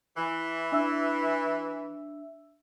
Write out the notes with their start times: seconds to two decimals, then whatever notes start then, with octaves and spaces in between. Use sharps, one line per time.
0.17 E3
0.72 D4 E5 E6